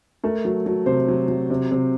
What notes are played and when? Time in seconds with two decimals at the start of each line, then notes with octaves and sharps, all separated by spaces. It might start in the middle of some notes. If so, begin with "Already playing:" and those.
0.23 A3 A#4
0.45 F#3
0.66 F#3
0.86 C3 C5
1.08 F#3
1.28 F#3
1.50 C3
1.71 C3